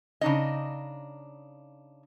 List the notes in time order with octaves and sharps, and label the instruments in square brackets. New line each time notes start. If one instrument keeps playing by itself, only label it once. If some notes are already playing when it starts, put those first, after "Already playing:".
[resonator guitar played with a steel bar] C#3 D4 D#4 D#5